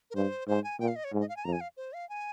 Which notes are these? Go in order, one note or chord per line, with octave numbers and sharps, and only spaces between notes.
A#4
G2 C5
G#2 C5
G#5
A#2 G5
F5
D#5
C#5
G#2
D#5
F5
G#5
F2 A#5
G#5
F5
C5
F5
G#5